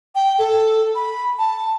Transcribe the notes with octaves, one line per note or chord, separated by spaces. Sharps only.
G5
A4
B5
A5